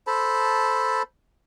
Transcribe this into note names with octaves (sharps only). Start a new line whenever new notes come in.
A4 C5 A5 B5